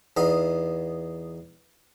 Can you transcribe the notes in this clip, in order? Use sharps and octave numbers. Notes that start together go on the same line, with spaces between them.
E2 B3 D#4 F5